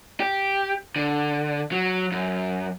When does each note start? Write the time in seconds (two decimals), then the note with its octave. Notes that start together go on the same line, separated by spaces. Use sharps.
0.20 G4
0.96 D3
1.72 F#3
2.12 F#2